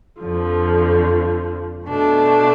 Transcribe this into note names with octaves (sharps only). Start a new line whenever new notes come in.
F2 D3 F3
B2 A3 D4